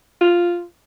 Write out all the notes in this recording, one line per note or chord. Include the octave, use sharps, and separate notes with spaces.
F4